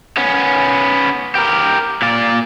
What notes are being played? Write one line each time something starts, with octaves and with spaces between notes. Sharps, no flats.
B3 C#4
G4 A#4
A#2 D5